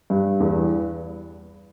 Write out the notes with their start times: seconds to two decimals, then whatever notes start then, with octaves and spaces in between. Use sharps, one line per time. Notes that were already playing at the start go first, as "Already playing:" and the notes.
0.10 G2
0.40 E2